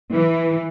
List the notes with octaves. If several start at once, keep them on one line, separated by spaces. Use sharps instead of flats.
E3